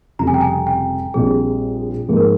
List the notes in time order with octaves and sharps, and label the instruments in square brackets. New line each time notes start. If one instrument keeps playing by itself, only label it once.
[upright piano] F1 F2 C#3 G3 [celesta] A#5
[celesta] G#5
G5
G#5
G5
[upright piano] A#1 A#2 G3 C4 [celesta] G#4
[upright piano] G#2 F3 A#3 [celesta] G#4
[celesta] A#4